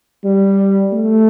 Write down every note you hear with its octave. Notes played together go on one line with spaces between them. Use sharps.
G3
A3